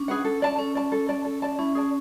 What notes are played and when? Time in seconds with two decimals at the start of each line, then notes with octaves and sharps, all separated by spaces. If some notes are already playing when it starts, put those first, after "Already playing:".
Already playing: C#4 D4
0.08 G#4 B4 F#5
0.25 A4
0.42 D5 A5
0.58 C#4 A4
0.75 D5 A5
0.92 A4
1.09 D5 A5
1.25 A4
1.42 D5 A5
1.58 C#4 E4
1.75 G#4 D5 A5